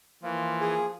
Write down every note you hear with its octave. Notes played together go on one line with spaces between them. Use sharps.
E3 F3 A#3 F4
G#4